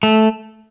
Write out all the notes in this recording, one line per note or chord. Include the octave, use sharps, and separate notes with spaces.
A3